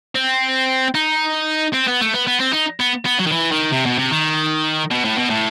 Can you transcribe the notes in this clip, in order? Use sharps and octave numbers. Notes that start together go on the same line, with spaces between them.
C4
D#4
C4
B3
A3
B3
B3
C4
D#4
B3
B3
F#3
D#3
E3
D#3
C3
B2
C3
D#3
B2
A2
B2
A2